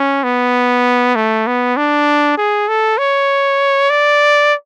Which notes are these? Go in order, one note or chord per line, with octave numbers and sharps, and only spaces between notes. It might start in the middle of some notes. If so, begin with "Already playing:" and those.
Already playing: C#4
B3
A3
B3
D4
G#4
A4
C#5
D5